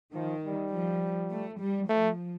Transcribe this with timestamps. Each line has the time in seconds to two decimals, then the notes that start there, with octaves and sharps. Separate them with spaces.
0.14 D#3 F3
0.44 G3
0.72 F3
1.31 A3
1.60 G3
1.89 F3 A3